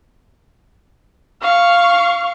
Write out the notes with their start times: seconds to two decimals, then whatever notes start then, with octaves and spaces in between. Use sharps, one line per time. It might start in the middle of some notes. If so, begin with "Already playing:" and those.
1.41 F5 C#6